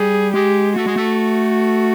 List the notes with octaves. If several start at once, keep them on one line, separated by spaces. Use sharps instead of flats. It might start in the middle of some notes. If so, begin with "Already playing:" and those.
Already playing: G3 G#4
G#3 G4
A3 F#4
G#3
A3